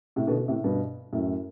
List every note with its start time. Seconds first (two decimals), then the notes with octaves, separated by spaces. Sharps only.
0.16 A2 C3
0.27 B2 D3
0.38 B2 D3
0.48 A2 C3
0.64 G2 B2
1.13 F#2 A2